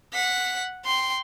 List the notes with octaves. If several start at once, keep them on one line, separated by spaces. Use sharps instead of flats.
F#5 B6
G5 C6